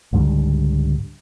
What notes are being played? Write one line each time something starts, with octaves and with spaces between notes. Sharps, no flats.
C#2 G#2 D3 G3